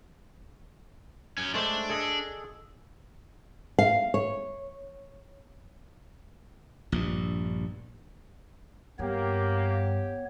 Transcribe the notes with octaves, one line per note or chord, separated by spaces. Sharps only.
F#2 C#4
G#3 A3 D4 C5
G#4 A4 D#5
F5
C#5
A#1 G2
G2 A#3 B3 G4 C#5